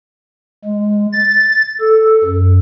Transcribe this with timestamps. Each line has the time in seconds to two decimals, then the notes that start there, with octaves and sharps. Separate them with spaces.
0.64 G#3
1.13 A6
1.80 A4
2.24 F#2